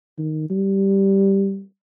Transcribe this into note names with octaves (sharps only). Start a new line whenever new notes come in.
D#3
G3